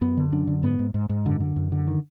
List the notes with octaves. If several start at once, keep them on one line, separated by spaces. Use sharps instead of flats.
F#2 B3
D3
F#2 D4
D3
G#2 B3
G#2
G#2
G#2
F#2 D3
D3
F#2
D3
D#3